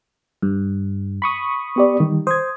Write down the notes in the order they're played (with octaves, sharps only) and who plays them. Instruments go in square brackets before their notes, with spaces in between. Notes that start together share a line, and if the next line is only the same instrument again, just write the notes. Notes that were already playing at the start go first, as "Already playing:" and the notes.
[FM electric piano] G2
B5 C#6 D#6
[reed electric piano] B3 G4 D5
D#3 G3
[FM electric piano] C5 [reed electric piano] D#6 G#6